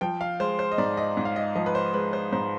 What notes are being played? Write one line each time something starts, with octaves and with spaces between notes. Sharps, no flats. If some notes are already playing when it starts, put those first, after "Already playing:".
F3 G5
F5
G#3 C5
C5
D#5
G#2 D5
D#5
G#2
F5
D#5
F3 D#5
B4
C5
G#3 B4
C5
G#2 C5